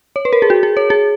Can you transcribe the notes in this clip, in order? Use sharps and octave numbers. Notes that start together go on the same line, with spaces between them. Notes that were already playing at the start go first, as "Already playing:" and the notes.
C#5
B4
A#4
G#4
F#4
G#4
C#5
G#4